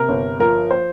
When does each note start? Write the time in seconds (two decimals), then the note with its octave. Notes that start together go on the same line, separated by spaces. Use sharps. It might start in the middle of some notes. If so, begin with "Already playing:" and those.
Already playing: C3 A#4
0.09 G1
0.40 F3 A#4
0.71 C5